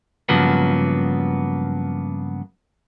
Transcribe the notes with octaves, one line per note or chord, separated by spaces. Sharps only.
G2 C#3 F3 F#3 A#3 B3